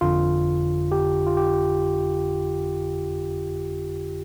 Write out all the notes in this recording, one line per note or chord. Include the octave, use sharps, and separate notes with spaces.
G1 F2 D3 F4
G4
F4
G4